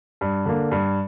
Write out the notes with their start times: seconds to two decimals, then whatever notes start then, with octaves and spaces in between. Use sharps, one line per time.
0.21 G2
0.46 D3 A#3
0.71 G2